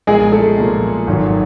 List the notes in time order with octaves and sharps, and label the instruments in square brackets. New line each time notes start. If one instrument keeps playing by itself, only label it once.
[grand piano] B1 A#2 F3 A#3 [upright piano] G#3 G#4
[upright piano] A3 A4
[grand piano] B1 A#2 F3 A#3
G#1 G#2 D#3 F#3